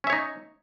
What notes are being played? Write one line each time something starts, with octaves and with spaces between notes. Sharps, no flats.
C#4 D#4 C#5 E5